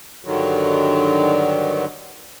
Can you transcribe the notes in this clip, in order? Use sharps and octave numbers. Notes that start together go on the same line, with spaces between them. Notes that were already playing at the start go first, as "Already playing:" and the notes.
G2 D3 D#3 F#3